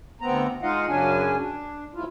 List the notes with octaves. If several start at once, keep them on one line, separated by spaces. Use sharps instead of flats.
D2 B3 C4 A#5
G#3 D#4 F4 D#5 F5 F#5
F#2 C#3 F#3 C#4 D4 G#5
D4
D#2 G#2 E4 F4